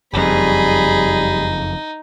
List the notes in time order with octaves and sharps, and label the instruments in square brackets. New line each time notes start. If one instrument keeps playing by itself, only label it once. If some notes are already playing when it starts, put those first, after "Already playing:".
[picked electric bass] F#1 F2 [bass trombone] G3 [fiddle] D#4 [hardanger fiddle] G#4 B5